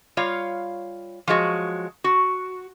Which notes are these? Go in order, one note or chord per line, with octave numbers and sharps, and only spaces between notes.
G3 F4 C#5 F5
F3 F#3 G#3 F#4
F#4